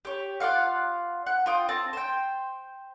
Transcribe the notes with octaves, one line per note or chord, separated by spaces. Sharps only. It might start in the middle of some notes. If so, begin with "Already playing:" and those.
G4 C#5
F4 D5 F5 F#5
F#5
F4 G5 D#6
C4 A5
C5 G5